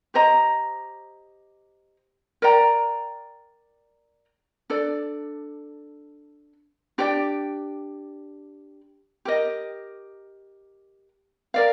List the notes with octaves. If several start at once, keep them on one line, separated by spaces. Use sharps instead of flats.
G4 C5 D#5 A#5
A#4 D5 G5 A#5
D4 A4 D5
D4 G4 D5 G5
G4 A#4 D#5
A#4 D5 F5